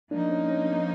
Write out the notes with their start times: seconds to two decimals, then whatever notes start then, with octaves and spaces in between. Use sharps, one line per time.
0.11 F3 A#3 D4 D#4
0.29 C#4
0.48 C#4
0.66 C4